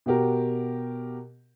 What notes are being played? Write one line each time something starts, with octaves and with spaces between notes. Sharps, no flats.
B2 F#4 G4 A#4